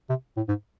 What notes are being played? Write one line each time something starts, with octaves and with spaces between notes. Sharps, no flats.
C3
A2
G#2